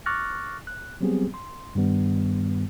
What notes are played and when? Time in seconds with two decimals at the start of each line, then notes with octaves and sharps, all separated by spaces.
0.06 C#6 D6 F6 F#6 A6 A#6
0.67 F#6
1.01 F#3 G3 B3 C4 G4 G#4
1.34 C6
1.75 G2 D#3 G3 B3